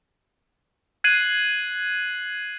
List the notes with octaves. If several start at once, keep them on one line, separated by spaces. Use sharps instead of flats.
F#6 G#6 C7 D#7 F#7